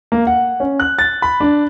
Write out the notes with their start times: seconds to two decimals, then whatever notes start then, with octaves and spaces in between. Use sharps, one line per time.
0.12 A#3
0.27 F#5
0.60 C#4
0.80 F#6
0.99 A6
1.22 B5
1.40 D4